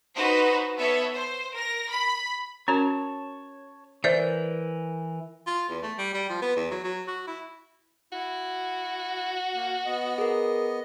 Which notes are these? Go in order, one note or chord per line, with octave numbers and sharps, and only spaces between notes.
D#4 F#4 B4 C5
B3 A4 C#5 E5
C5
A#4 A#6
B5
C#4 F#4 A#4 C#5 A5
E3 A#4 C5 D5 E5 G6
F4
E2
A3
G3
G3
F3
B3
E2
F#3
F#3
F#4
E4
E4 F#4
A#3
B3 D#5
G#4 A#4